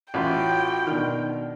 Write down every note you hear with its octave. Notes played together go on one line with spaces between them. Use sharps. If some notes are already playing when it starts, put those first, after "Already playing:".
A1 C#4 F4 F#4 G5 B5 C6
B2 D#3 D4 F6